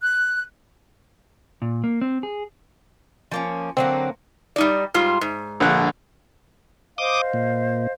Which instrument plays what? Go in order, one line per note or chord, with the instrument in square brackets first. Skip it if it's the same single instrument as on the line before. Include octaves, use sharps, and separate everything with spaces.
[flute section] F#6
[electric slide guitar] A#2
A#3
C4
G#4
[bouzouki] F3 A#3 C#4
[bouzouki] D3 F#3 A#3 [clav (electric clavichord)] C4
[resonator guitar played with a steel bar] G3 D#4 D5
G#2 G3 F4
G#2
[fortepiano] A#1 D3 F#6
[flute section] C5 D#5 F5 [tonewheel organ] D6 D#6
[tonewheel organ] A#2